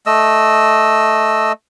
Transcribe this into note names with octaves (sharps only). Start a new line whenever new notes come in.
A3 D#5 E6